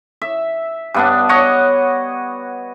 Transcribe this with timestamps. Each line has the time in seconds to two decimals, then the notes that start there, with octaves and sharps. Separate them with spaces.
0.22 E5
0.94 G2 B3 D4
1.29 C#5 D#5 F#5 D6